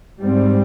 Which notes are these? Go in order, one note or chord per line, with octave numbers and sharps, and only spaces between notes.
G#2 G3 C4